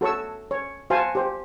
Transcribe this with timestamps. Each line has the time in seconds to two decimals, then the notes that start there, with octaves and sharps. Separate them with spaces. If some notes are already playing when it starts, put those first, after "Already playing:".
0.01 F#4 A4 C#5 C#6 E6
0.51 C#5
0.90 F#4 C5 F5 G#5 A5
1.15 G4 C5